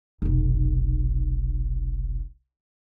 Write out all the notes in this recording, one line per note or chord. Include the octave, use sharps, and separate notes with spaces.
F1 B1